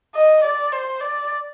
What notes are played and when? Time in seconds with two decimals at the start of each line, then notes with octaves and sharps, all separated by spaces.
0.15 D#5
0.44 D5
0.72 C5
1.01 D5